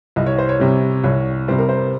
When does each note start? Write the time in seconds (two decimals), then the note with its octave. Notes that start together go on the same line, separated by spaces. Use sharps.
0.16 C2 D#5
0.26 C#5
0.38 C5
0.49 C#5
0.60 C3 G3
1.04 C2 C#5
1.48 C3 G3 C5
1.58 A#4
1.69 C5